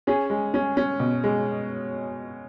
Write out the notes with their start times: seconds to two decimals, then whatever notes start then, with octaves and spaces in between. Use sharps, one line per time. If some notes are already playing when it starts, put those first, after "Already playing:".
0.07 C#4 G#4
0.30 G#3
0.54 C#4
0.77 C#4
1.00 B2
1.24 G#3